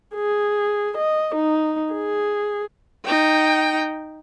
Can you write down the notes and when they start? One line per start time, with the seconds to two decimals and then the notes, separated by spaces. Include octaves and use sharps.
0.16 G#4
0.97 D#5
1.35 D#4
1.93 G#4
3.05 D#4 G5